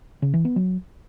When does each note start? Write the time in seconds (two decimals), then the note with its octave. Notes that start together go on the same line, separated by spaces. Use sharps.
0.22 C#3
0.34 E3
0.45 B3
0.56 F#3